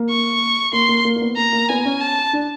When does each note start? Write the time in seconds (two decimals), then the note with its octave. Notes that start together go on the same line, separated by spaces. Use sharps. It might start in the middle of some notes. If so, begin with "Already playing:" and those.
Already playing: A#3
0.09 C#6
0.73 A#3 C6
0.88 A#3
1.05 A#3
1.16 A#3
1.21 B3
1.37 A#3 A#5
1.52 A#3
1.69 B3 G#5
1.85 C#4
2.00 A5
2.33 D4